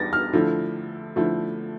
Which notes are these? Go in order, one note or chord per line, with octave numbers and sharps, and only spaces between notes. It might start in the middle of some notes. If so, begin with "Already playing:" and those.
Already playing: E2 G3 A6 A#6
F6
D3 F3 A3 E4
D3 F3 A3 E4